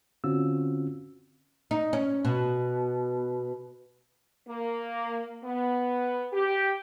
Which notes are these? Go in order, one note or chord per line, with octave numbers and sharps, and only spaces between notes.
D3 C4 C#4 F4 F#4 E6
D#4
C#4
B2
A#3
B3
G4